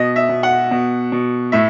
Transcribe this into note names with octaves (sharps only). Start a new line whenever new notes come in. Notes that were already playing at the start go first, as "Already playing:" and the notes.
Already playing: B2 D#5
E5
B2
F#5
B2
B2
A2 E5